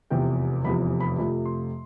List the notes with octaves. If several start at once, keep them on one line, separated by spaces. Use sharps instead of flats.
F1 E2 C3 F3 G5
F1 E2 C3 F3 B5
B5
F2 C3 F3 A3 B5
C6